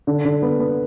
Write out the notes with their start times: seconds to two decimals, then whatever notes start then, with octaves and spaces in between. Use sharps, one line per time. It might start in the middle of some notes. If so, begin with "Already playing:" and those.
0.07 D3
0.25 D3
0.42 B3
0.60 B3